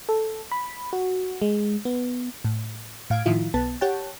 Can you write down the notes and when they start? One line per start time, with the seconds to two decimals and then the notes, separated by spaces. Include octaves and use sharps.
0.09 A4
0.52 B5
0.93 F#4
1.42 G#3
1.85 B3
2.44 A2
3.10 A2 F5 G#6 D7
3.26 A2 D#3 F3 E4 F4
3.54 B1 B3 A5
3.81 G4 C#5 F#5 G5 A5